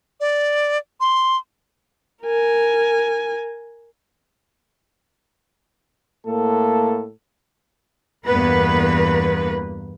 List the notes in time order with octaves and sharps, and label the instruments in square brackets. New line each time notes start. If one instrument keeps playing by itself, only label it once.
[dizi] D5
C6
[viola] A#4 G#5
[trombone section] A2 A4 [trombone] A#3
[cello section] E2 G2 A#3 B3 B4